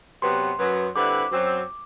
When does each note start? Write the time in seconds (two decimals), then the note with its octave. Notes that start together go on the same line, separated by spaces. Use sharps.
0.22 C3 F#3 B3 C6
0.59 F#2 F#3 B3
0.95 D3 G3 C4 E4 B4 D6
1.32 F#2 F#3 C4